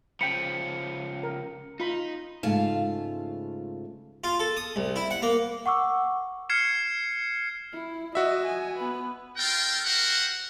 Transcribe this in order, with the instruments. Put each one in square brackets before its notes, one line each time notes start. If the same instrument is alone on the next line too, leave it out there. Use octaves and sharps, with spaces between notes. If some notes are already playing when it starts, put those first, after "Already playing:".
[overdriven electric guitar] C#3 F3 [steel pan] G5 B5 [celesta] C#7
[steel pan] A#4
[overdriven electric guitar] D#4 [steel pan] F4 B5
[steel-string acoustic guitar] G#2 C#3 A3 F4 F5 A5
[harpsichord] F4
A4
D#6
C2
E4
F#5
A#3
[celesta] F#5 C#6 D6 E6
[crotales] F6 G#6 C7 C#7 E7
[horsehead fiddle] E4
[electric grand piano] F#4 E5 [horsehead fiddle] D#5
[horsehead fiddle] G#5
B3 B4
[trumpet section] F4 A4 A#4 G5
F#4 G4 A#4 C5 F#5